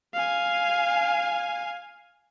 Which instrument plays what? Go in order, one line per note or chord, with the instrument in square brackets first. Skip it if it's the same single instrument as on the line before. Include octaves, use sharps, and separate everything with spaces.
[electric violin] F5 G#5